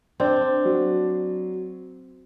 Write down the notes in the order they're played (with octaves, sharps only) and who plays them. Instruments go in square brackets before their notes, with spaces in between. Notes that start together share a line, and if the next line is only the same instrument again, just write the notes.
[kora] C4 [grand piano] D4
[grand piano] F#3